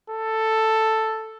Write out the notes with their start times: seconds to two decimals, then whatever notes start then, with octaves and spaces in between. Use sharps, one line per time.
0.10 A4